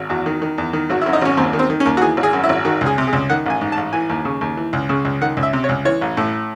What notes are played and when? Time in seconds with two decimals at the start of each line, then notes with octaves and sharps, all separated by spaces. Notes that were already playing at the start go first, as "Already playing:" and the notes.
Already playing: G#1
0.09 E2 F#4
0.26 D#3
0.42 D#3
0.58 E2
0.73 D#3
0.90 G#1 F#4
1.01 F#2 E4
1.13 D#4
1.22 G#1 C#4
1.37 D#2 C4
1.53 D#3
1.59 C4
1.70 D#3
1.80 C#4
1.86 D#2
1.97 F#4
2.02 E3 G#4
2.17 G#1
2.23 G#4
2.33 F#2
2.44 E4
2.49 G#1
2.65 D#3 F#4
2.81 C#2
2.86 G#4
2.98 C3
3.07 G#4
3.13 C#2
3.29 D#3 F#5
3.46 A1 G#5
3.61 G#2
3.72 A5
3.77 A1
3.93 E3 G#5
4.10 D#2
4.25 C#3
4.41 D#2
4.57 E3
4.73 C#2
4.89 C#3
5.05 C#2
5.21 D#3 F#5
5.37 C#2
5.43 E5
5.53 C3
5.64 C#5
5.69 C#2
5.85 E3 C#5
6.01 A1
6.17 A2